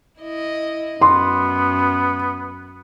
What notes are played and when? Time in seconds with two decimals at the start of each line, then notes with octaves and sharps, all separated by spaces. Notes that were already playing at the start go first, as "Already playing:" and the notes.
0.19 E4 D#5
1.02 F#2 B3 C6